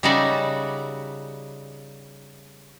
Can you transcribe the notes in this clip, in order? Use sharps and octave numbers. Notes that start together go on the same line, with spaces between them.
C#3 G3 D#4 F#4 D5 E5